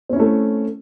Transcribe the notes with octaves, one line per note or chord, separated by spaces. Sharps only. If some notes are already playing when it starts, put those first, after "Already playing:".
A3 C4 C#4 E4